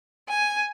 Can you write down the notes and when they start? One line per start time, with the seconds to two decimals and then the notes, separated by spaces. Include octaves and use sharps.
0.29 G#5